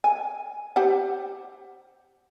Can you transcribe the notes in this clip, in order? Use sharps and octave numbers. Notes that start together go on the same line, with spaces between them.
G#5
G4 C5 F#5